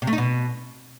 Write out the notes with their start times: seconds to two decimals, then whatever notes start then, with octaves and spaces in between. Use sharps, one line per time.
0.02 C3
0.07 A3
0.13 D#4
0.18 B2